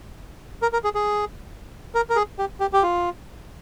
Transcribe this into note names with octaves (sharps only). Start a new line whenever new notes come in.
A#4
A#4
G#4
G#4
A#4
A#4
G#4
G4
G4
G4
F4